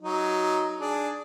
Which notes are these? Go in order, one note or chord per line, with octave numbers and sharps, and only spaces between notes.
F#3 D#4
D4 G#4